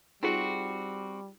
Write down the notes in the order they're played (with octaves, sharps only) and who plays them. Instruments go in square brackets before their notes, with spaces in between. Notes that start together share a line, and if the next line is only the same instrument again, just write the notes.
[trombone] G3 [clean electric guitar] C4 F#4 [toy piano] D#4 F4 G#4